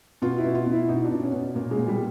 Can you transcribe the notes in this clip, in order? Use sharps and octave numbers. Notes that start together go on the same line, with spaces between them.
B2 F4
E4
B2
F4
B2
E4
B2 D#4
D4
B2
C#4
B2
A#2 A#3
G#3
A#2
G3